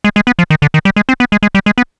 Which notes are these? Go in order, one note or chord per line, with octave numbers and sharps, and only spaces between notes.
G#3
G#3
B3
F3
D#3
D3
D#3
G3
G#3
C4
B3
G#3
G#3
G3
G#3
B3